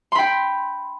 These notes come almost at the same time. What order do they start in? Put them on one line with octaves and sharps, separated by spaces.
C6 B5 G5